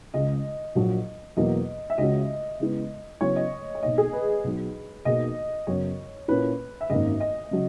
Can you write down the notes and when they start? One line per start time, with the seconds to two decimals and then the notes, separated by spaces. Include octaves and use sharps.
0.14 C#2 C#3 G#3 D#5
0.75 A#1 A#2 F#3
1.37 E2 B2 F#3 A#3 D#5
1.90 E5
1.98 C#2 C#3 G#3 C#4 F#4 D#5
2.60 C#3 G#3 B3 E4 B4
3.21 C#3 F#3 B3 E4 C#5
3.36 D#5
3.75 C#5
3.83 B1 B2 A#3 D#4 D#5
3.98 G#4
4.13 B4
4.44 B1 B2 F#3
5.05 B1 B2 A#3 D#4 G#4 D#5
5.67 F#2 C#3 F#3 B3 C#5
6.28 A#2 A#3 C#4 E4 B4
6.81 E5
6.90 G#1 F#2 D#3 A#3 D#5
7.20 D#5
7.51 C#3 F#3